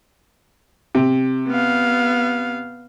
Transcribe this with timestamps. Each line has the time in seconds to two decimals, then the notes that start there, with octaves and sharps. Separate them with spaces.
0.95 C3
1.47 B3 F5